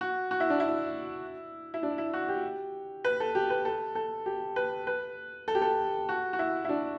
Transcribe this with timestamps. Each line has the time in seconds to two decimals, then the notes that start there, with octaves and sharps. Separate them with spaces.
0.01 F#4
0.31 F#4
0.40 E4
0.50 D4
0.60 E4
1.74 E4
1.83 D4
1.98 E4
2.14 F#4
2.29 G4
3.05 B4
3.20 A4
3.35 G4
3.50 B4
3.65 A4
3.95 A4
4.26 G4
4.56 B4
4.87 B4
5.48 A4
5.55 G4
5.62 A4
6.09 F#4
6.33 F#4
6.39 E4
6.65 E4
6.69 D4